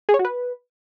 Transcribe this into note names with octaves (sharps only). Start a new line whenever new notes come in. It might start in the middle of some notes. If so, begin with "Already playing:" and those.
G#4
C#5
F#4
B4